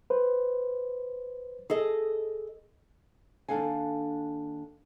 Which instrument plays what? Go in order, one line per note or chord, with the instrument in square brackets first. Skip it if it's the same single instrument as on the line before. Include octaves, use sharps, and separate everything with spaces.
[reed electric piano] B4 C5
[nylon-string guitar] G#4 A4 D#5
D#2 D#3 D4 A4 F5 G#5